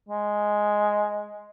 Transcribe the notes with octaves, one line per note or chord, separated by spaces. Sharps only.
G#3